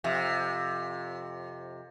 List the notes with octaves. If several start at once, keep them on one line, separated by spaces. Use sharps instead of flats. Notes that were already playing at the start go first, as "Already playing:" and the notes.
F2 C3